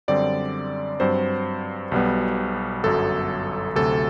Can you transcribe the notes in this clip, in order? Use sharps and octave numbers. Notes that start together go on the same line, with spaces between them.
F#2 D3 G3 C4 D5
G2 F#3 C4 C5
B1 B2 G3 B3
G1 F#2 F#3 A4
D2 C3 F#3 A4